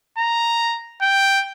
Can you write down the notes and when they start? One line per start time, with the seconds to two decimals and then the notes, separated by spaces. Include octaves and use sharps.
0.18 A#5
1.02 G5